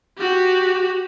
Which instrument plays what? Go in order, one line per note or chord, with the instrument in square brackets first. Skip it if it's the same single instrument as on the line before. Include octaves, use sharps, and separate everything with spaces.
[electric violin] F#4 G4